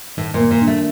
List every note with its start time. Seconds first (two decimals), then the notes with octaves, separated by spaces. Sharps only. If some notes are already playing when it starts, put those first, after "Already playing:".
0.17 A2 D#3
0.34 A#2
0.40 A#3
0.51 A#2
0.62 D4
0.67 A3